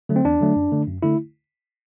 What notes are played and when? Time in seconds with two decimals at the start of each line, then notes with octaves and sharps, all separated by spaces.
0.09 D3 F#3 A3
0.16 C4
0.25 E2 D4
0.41 D3 F#3 A3
0.56 F#2
0.72 D3 A3
0.87 F#2
1.03 D3 A3 E4